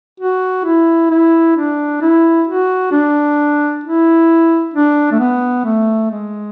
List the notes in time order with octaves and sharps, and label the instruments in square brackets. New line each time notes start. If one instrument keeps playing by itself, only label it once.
[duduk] F#4
E4
E4
D4
E4
F#4
D4
E4
D4
A3
B3
A3
G#3